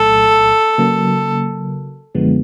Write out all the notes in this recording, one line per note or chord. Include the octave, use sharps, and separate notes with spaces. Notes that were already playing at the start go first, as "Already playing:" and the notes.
Already playing: C2 A#2 F#3 A3 A4
C#3 F#3 A#3
F#2 D3 F3 G#3 B3